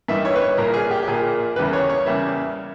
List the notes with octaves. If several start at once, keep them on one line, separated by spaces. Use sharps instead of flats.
G2 E3 A#3 D#4 E5
C#5
B4
C#5
A#1 A#2 A#3 A#4
G#4
G4
G4
A#1 A#2 A#3 G#4
E2 C#3 G3 A#3 B4
C#5
C#5
E2 C#3 G3 A#3 E5